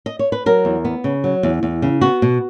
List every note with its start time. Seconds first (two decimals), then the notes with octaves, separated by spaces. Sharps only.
0.06 D#5
0.19 C#5
0.32 B4
0.46 F#3 A#4
0.65 E2
0.85 B3
1.04 C#3
1.24 F#3
1.43 E2
1.63 E2
1.82 C#3
2.01 B3 F#4
2.22 B2